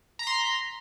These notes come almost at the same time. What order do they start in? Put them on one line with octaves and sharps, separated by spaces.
A#5 B6 C6